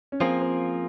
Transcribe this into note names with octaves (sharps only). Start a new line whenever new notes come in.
C#4
F3 A#3 C4 F4 G#4
C4